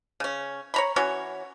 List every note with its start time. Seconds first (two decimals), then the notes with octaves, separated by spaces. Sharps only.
0.20 C#3 C#4
0.74 C#5 A#5 B5
0.96 E3 C#4 F#4 C#5